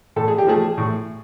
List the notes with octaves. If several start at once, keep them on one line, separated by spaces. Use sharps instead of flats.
A2 A4
G#4
G4
F3 A3 G#4
A2